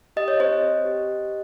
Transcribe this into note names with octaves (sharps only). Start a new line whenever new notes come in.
G4 D#5
C#5
C4 C5 D#5
C4
G4
G4